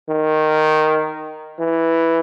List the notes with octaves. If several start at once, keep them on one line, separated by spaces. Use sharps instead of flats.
D#3
E3